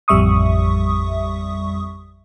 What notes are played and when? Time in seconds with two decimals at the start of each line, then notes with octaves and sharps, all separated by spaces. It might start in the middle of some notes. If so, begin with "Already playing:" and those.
0.08 A1 F2 G3 E5 C#6 D#6